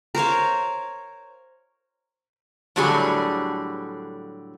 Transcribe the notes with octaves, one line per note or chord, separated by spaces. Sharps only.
A#4 C5 C#5 F5
A2 D3 F#3 G3 G#4